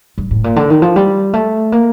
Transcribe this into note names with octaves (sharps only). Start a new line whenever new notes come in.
G2
A2
A#2
D3
D#3
F3
G3
A3
A#3